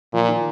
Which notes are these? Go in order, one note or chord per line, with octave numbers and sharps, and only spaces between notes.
A#2 F3
D#3